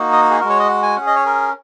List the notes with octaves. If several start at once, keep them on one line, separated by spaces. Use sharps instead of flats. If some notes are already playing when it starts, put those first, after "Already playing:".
Already playing: A#3 D#4 F#4
D#5
F#5
G#4
G#3 F#4 A#4
C#5
D#5
F#5
G#5
C#4 G#4 F#5
D#5
C#5
A#4